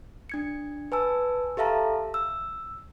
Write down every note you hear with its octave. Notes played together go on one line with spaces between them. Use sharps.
D4 G#6 C#7
B4 G#5 A5 E6
G4 A4 E5 F5 A5 A#5
E6